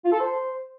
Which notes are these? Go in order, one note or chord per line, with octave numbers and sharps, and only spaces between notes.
F4
A4
C5